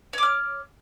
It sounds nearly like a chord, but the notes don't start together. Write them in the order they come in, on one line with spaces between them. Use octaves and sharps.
C#5 D6 F6